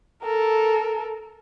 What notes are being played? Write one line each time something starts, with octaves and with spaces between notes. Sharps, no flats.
A4 A#4